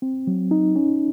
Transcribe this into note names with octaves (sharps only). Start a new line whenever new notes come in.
C4
F#3
D#4
C#4